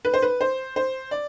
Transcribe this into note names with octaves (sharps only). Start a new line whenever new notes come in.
B4
C5
B4
C5
C5
D5